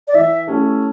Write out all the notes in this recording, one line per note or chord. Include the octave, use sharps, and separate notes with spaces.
D5
E3 E5
A3 C#4 E4 G4